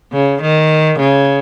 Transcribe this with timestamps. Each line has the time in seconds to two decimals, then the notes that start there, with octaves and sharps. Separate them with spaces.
0.12 C#3
0.42 D#3
0.99 C#3